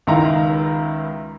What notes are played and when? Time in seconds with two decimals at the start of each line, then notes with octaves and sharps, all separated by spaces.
0.07 C#2 D#3 E4 A#5